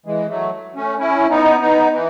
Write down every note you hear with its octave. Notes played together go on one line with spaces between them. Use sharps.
E3 G#3
F#3 A3
A3 C#4
C#4 E4
B3 D#4
B3 D#4
E3